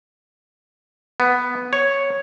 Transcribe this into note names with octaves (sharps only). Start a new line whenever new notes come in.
B3
C#5